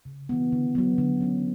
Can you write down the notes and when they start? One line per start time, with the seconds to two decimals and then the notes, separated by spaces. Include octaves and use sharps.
0.05 C#3
0.29 E3 B3
0.52 D3
0.75 F#3 B3
0.98 D3
1.20 F#3 C#4